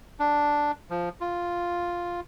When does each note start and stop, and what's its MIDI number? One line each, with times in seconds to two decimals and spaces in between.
0.20 0.71 62
0.90 1.09 53
1.21 2.20 65